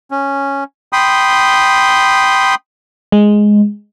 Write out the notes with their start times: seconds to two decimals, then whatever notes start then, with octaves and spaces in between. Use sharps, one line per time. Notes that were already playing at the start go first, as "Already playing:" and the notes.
0.11 C#4
0.93 G5 B5 C6 D#6
3.12 G#3